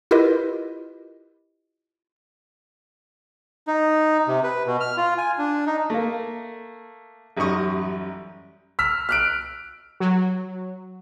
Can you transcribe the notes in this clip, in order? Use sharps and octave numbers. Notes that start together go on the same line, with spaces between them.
E4 F4 G4 A#4 B4 D#5
D#4
C3
B4
B2
F6
F4
G#5
D4
D#4
A3 A#3
A1 F#2 G3 D#4 C#6 D#6
E6 F6 B6
F6 F#6 D7
F#3